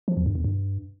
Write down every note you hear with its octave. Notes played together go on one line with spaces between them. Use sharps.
F3
E2
G2
E2
G2